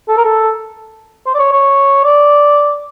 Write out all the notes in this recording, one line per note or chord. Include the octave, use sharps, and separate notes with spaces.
A4
A#4
A4
C5
D5
C#5
C#5
D5